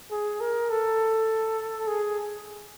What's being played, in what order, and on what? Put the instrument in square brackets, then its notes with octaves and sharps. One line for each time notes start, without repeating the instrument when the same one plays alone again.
[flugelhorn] G#4
A#4
A4
G#4